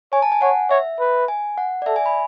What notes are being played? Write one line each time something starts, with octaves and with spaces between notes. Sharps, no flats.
C#5 G#5
A5
G#5
C#5 F#5
C#5 E5
B4
G#5
F#5
D5
A4 E5
G#5
B5